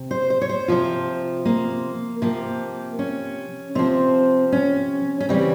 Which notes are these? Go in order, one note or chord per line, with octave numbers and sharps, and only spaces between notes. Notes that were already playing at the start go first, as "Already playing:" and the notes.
Already playing: C3
C5
C5
C#5
C5
C3 F3 F4
A#3
C3 F3 A#3
C#4
C3 F3 C4
C#4
C#4
C#3 E3 G3 C4